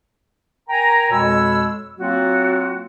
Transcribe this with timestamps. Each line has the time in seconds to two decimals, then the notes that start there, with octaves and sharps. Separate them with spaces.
0.69 A#4 G5 G#5 A#5
1.11 F2 B2 G#3 C#5 B5 E6
1.99 F#3 A#3 C4 F4 F#4